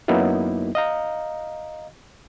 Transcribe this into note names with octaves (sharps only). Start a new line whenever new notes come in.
F#2 F#3 A#3 B3 D#4 E4
D#5 F5 A#5